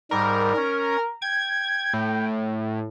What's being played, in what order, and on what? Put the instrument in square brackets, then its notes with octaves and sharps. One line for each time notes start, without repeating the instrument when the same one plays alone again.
[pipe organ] G#2 G3 [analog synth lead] A#4
[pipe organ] C#4
[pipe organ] G5 [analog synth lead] G#6
[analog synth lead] A2